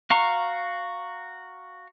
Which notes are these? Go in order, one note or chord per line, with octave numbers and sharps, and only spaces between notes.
F#4 F5 A#5 C#6